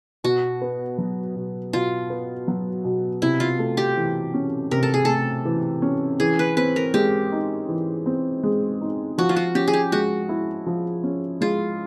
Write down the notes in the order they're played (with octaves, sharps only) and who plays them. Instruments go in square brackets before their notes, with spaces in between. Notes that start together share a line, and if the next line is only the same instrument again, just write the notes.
[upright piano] B2 [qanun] F#4
[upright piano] B3
F#3
B2
[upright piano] B2 [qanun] F4
[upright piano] B3
F#3
B2
[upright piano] C3 [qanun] E4
[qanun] F4
[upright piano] A3
[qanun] G4
[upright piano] E3
C#4
[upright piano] C3 [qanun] A#4
[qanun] A4
G#4
[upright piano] A3 [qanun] A4
[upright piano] E3
C#4
[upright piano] E3 [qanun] G#4
[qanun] B4
[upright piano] C4 [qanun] B4
[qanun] A#4
[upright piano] G#3 [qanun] G4
[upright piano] D#4
E3
C4
G#3
D#4
[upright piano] F3 [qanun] F#4
[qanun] F4
F#4
[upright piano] C#4 [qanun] G4
[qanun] G#4
G4
[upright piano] G#3 [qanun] F#4
[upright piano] E4
F3
C#4
[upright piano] G#3 [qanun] F4